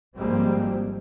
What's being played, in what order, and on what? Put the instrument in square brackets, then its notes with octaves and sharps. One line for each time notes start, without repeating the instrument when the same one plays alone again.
[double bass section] G#1 F3 G3 G#3 A#3 C4